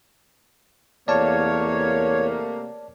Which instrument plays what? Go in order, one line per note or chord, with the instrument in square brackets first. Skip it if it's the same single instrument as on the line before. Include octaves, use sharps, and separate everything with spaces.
[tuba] E2 [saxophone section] C3 A3 A#3 [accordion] C#5 [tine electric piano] D5 A5